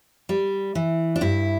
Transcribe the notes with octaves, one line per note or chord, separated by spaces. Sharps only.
G3
E3
D4
G2 E4